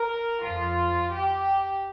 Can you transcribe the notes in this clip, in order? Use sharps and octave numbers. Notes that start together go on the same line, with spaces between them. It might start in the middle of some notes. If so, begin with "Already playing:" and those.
Already playing: A#4
F2 F3 F4
G4